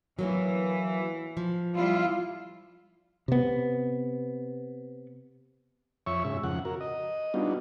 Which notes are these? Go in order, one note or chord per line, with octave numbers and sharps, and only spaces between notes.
E3 F#3 A#3 B3
F3
G3 E4 F4
C3 B3
F2 C#5 E5 C#6
G#2 C#3 E5
F2 C#3 F#5
F#4 A#4
D#5
G3 B3 D4 D#4 F4 F#4